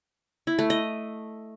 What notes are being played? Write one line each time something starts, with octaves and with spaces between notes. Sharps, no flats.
E4
A3
D#5